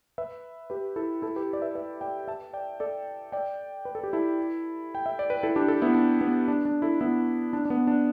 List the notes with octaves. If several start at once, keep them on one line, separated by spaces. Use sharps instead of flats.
B4 E5
G4 B4
E4 A4
E4 A4
G4 B4
D5
B4 E5
B4 E5
D5 G5
E5 A5
D5 G5
A4 D5
D5 G5
B4
A4
G4
E4 A4
G5
E5
D5
B4
E4 A4
D4 G4
E4 A4
B3 E4
D4
B3
D4
D4
E4 A4
B3 E4
D4
D4
B3
D4